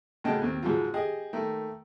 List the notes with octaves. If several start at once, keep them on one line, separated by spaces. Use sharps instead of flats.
F#2 A2 C#3 D#5 G5 A5
D#2 C4
G#2 C#3 F3 F#3 F4
G4 G#4 D#5
D#3 A3 A#3